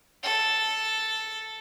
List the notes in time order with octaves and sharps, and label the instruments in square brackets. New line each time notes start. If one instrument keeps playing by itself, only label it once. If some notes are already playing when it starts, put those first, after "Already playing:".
[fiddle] A4